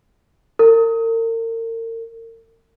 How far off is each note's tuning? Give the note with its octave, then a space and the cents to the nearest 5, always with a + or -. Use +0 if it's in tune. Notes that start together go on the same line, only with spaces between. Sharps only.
A#4 -40